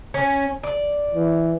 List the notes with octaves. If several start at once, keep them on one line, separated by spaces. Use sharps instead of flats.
C#4
D5
E3